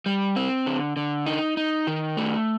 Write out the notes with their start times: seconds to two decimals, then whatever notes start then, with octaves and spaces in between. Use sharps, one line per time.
0.06 G3
0.36 C4
0.66 D3
0.97 D3
1.26 D#4
1.57 D#4
1.87 D#3
2.17 A3